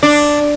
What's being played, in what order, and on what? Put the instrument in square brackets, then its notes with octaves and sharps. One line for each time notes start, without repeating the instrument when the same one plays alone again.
[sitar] D4